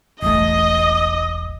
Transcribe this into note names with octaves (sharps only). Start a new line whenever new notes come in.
E1 A1 A3 D#5 D#6